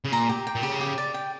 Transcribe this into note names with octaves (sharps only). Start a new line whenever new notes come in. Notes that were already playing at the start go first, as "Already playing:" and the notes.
C#3
A#2 A#5
G4
G5
A#2
C#3 G4
G4
D5
G5